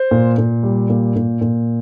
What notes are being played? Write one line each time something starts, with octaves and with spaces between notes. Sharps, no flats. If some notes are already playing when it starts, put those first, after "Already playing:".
Already playing: C5
A#2
A#2
G3
A#2
A#2
A#2